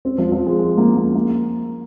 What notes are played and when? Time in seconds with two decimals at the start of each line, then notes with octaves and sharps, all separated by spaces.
0.05 C4
0.18 F3
0.32 F3
0.46 G#3
0.59 G#3
0.78 A#3
0.97 A#3
1.15 A#3